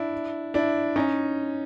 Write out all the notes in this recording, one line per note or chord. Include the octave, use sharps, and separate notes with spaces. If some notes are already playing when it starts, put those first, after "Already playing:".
Already playing: D4 E4
D4 E4
C#4 D#4